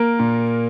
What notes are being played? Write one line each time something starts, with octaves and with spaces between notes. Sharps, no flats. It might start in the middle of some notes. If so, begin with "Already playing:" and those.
Already playing: A#3 A#4
A#2